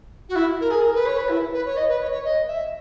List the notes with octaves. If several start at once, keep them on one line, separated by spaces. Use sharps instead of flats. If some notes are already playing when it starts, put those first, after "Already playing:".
F#4
E4
A#4
G#4
A#4
B4
C#5
B4
E4
B4
C#5
D#5
B4
C#5
C#5
D#5
E5